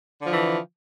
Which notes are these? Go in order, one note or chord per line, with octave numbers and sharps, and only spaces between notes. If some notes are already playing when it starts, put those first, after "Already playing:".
D3 E3 F3